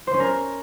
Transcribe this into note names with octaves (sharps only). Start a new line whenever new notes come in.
C5
C#4
A#4